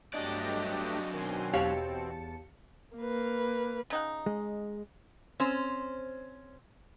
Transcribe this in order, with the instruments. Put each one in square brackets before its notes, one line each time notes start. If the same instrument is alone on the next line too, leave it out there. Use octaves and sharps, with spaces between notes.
[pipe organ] G2 A3 G4 [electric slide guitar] F#3 D4 D5 [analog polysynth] D#5
[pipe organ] B2 C4 [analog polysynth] D#3 G#5 C6
[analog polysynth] E2 A5 C#7 [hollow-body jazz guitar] G4 C#5 F5
[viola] A#3 B4
[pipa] C#3 D#4 F#5
[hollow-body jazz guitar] G#3
[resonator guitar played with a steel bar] C4 C#4 C5